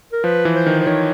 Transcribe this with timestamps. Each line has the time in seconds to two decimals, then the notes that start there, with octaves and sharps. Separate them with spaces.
0.13 A#4
0.24 F3 B4
0.45 E3
0.55 C5
0.66 D#3
0.80 C5
0.87 D#3 C#5